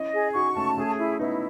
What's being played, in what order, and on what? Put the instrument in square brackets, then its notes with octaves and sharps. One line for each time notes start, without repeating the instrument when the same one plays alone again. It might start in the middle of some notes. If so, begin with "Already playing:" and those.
Already playing: [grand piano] C#4 E4 [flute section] D#5
[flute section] G#4
[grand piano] D#4 F#4 [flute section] C#6
[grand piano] A3 C#4 [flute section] A5
[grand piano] A3 C#4 [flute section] G#4
[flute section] E4
[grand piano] B3 D#4 [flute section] E4